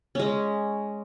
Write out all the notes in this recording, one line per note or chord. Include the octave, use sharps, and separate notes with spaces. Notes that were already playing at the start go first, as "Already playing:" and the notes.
G#3 C#4